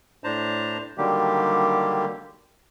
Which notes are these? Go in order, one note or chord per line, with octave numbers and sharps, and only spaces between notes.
A2 D4 C5 A5 A#5
D3 D#3 F#3 G3 A#3 G4